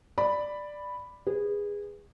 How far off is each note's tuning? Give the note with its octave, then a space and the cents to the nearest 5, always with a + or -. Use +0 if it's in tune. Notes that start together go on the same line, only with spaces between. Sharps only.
D5 +5 B5 +0
G#4 -20 B4 +0